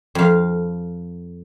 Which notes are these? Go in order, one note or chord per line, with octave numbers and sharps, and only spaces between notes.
F2 F5